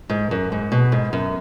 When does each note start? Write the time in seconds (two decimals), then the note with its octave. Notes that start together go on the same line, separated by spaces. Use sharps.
0.09 G#2
0.31 F#2
0.52 G#2
0.72 B2
0.92 G#2
1.13 F#2